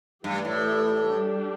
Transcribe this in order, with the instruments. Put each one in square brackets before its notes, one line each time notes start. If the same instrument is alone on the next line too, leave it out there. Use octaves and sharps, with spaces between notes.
[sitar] G2 [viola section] E3 A3 E4 G4 D5
[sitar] A2
[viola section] G3 D4 G4